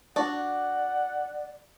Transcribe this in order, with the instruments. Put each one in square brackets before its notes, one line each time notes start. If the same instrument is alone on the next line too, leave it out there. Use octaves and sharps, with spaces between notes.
[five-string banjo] D4 F#4 [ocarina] D5 [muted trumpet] F#5